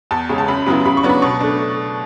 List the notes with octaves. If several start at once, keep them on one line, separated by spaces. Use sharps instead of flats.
E2 A5
C#3 G#3 C#4
A5
F#2 B5
C#3 F#3 B3 E4
C#3 B5
C#6
F#3 B3 D4
B5
B2 C#6
A3 D4